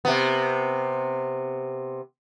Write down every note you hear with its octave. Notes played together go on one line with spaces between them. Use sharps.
C3 B3